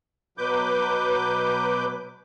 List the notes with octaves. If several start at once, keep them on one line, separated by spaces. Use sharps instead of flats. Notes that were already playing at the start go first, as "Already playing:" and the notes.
B2 F#3 B4 D6 G6